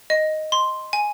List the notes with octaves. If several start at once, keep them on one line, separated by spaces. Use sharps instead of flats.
D#5
C6
G#5